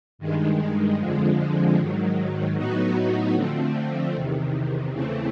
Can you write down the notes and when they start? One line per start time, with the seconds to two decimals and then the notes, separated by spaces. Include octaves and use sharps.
0.19 G2 D#3 G#3
0.98 F2 D3 F3 G#3
1.77 G#2 D#3 F#3
2.56 A2 F#3 B3 D#4 F#4
3.34 D3 F3 A3 C4
4.13 E2 C3 D#3
4.92 E2 C#3 E3 A3 C4